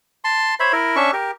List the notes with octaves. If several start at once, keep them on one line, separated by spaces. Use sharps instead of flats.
A5 C6
C5 C#5 E5 B5
E4 A#4
C#4 D4 E5 C#6
G4 A#4